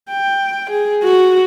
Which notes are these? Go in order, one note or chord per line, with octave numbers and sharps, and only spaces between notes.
G5
G#4
F#4